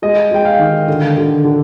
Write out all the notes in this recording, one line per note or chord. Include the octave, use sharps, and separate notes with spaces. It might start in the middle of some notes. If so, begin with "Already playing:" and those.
G#3 D#5
G#3 G5
F5
D#3
D3
D3
D3